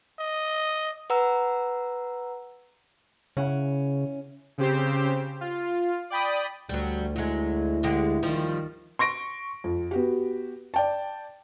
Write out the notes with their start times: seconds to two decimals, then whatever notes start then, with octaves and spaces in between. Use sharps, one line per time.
0.19 D#5
1.10 B4 F#5 A#5 E6
3.37 C#3 C#4 E4 F#5
4.58 C#3 C4 G4 C5
5.41 F4
6.10 D5 G5 B5 D#6
6.69 D2 F#3 G3
7.16 F#3 G#3 E4
7.83 D3 G#3 G4
8.23 D#3 F3 G3
8.99 C6 C#6 A#6 D7
9.64 F2
9.91 B3 F#4 G4
10.74 D5 G5 A5